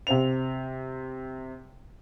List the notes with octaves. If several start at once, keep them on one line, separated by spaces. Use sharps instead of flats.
C3 C4 F7